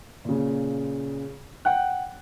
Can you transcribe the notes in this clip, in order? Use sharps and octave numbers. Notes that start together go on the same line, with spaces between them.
A#2 C#3
F#5 G5 F#6